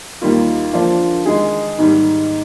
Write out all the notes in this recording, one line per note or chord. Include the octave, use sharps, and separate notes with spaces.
D#2 D#3 G3 A#3 F4
D3 F3 A#3 D4 F4
D#3 G#3 D#4 G#4
G#2 D#3 G3